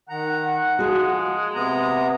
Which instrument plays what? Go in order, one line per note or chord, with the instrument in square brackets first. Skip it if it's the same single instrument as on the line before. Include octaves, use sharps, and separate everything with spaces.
[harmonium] D#3 A#5 [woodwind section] F#5
[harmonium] F3 [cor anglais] G#3 [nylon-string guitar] F#4 G#4
[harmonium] C3 B3 A#5